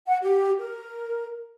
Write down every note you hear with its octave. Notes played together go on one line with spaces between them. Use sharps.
F#5
G4
A#4